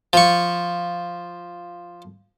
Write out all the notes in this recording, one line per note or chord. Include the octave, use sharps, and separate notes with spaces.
F3 C#6